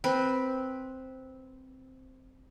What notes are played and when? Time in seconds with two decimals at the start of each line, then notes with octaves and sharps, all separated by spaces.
0.04 C4 B4